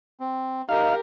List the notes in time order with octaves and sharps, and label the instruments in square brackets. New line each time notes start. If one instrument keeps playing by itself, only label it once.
[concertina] C4
[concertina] D#4 [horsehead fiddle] G4 A#4 [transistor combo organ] F5